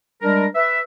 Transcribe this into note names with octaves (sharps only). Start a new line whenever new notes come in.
G3 G#3 D4 A#4
B4 E5